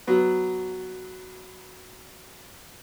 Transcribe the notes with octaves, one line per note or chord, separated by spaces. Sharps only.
F#3 B3